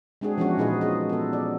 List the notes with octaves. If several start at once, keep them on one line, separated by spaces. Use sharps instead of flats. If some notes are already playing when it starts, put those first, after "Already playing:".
G#3 C4 D4 F#4 G#4
E3 F3 B3 C#4 D4 F#4
A#2 D#4 F4 G#4 B4 D#5
C#4 G#4 D#5
B3 A4
D5